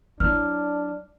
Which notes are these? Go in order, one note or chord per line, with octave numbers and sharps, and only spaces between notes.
F#3 D4 E4 F6